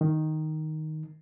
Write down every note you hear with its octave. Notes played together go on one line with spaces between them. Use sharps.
D#3